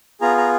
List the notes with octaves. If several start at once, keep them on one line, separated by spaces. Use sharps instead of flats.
B3 F4 G#4 A#5
A#5